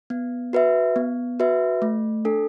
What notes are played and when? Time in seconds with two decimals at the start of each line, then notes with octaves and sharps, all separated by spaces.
0.10 B3
0.53 F#4 B4 E5
0.96 B3
1.40 F#4 B4 E5
1.82 A3
2.25 D4 A4